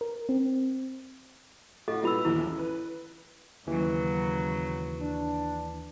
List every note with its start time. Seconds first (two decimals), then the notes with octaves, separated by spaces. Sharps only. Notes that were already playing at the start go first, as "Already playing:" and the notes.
0.01 A#4
0.29 C4
1.88 A2 F#4 A4 D#5 F5
2.03 A#2 G3 B3 E4 B5 E6
2.25 A#1 D#2 E3 E4
2.46 A1
2.59 B4
3.67 D#2 C#3 E3 F#3
5.00 D4